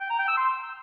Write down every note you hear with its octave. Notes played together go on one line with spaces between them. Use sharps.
G5
A#5
G5
E6
C6